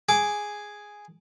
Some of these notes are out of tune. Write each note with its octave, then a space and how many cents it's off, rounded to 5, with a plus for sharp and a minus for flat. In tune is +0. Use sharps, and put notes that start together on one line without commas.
G#4 +0 D6 -10